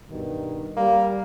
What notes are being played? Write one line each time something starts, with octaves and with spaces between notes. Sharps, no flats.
G2 B2 D#3
G3 A#3